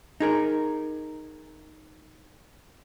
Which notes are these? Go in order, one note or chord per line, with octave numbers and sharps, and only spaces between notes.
D#4 G#4 A#4